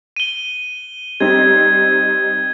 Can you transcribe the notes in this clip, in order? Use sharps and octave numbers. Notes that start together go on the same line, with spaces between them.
D#7 G7
G3 C4 D#4 G#6